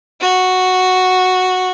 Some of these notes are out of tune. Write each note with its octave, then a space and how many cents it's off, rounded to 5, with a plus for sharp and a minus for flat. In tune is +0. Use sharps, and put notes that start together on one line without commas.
F#4 -5